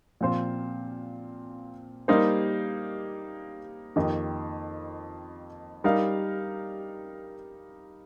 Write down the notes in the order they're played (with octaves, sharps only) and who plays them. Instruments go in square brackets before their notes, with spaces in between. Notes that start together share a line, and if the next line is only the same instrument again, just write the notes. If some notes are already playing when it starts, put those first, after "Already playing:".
[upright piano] A#2 F3 C4 F4 C5
G3 A#3 D#4 C5
F2 D#3 A#3 G4 D#5
G3 D#4 A#4 F5